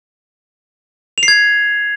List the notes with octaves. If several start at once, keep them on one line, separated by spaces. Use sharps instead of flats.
F7
C7
G#6